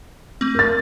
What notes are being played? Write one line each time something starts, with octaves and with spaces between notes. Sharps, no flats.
A3 C4
A#4 A6